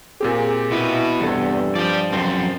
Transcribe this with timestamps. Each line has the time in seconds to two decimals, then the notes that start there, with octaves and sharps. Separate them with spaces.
0.21 A#2 C4 G4 G#4
0.71 B2 B3 E4
1.20 E2 G2 C3 A4
1.75 F3 D5 G5
2.12 F#2 C4